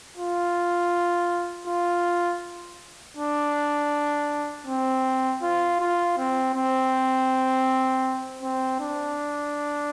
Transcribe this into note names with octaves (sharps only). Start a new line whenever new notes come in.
F4
F4
D4
C4
F4
F4
C4
C4
C4
D4